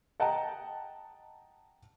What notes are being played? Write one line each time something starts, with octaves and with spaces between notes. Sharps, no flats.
D#5 F#5 G5 A5 A#5